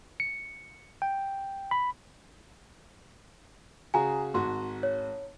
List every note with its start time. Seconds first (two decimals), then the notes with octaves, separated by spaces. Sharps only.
0.20 C#7
1.02 G5
1.71 B5
3.94 C#3 F#4 G#4 G#5 A#5
4.34 G#1 F#4 C6
4.83 C#5